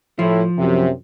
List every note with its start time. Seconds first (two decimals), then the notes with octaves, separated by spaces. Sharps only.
0.19 A2 F3 E4
0.58 F#2 C3